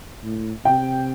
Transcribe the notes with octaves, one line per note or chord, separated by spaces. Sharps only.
A2
C3 G5